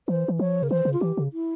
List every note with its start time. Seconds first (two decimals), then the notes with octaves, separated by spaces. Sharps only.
0.08 E3 C5
0.28 E3
0.39 F3 C#5
0.62 C#3 A#4
0.70 E3 C5
0.85 C#3
0.93 F4
1.01 E3 G4
1.17 C#3
1.33 E4